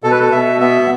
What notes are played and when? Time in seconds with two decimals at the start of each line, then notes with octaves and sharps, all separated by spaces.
0.04 B2 A4
0.11 B4
0.20 A4
0.32 B2 E5
0.61 B3 E5